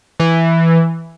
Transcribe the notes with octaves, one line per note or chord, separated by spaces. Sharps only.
E3